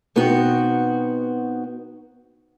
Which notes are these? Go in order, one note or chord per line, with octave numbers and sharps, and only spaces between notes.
B2 B3 C4 D#4 F#4